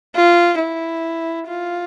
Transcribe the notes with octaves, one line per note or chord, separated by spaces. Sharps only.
F4
E4
F4